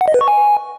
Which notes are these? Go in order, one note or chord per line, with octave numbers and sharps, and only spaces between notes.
F#5
D#5
B4
C#6
G#5